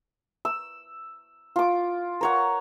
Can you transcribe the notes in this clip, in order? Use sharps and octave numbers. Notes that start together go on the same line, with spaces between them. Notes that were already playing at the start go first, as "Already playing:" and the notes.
E6
F4 D6
A#4 C#5 F#5